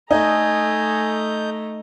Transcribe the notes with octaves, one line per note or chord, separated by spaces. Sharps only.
A3 D#4 A4 D#5 G#5 A#5 G6